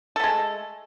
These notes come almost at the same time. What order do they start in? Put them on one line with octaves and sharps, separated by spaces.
A4 A3 G#3